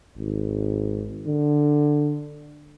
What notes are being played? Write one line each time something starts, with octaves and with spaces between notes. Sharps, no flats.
G#1
D3